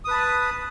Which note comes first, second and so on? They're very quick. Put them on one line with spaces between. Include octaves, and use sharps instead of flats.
D#6 B4 A5 B5